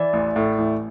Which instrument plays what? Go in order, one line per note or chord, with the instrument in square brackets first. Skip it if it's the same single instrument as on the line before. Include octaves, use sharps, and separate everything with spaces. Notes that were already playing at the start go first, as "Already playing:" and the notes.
Already playing: [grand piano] E3 [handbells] D5
[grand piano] A1
A2
A1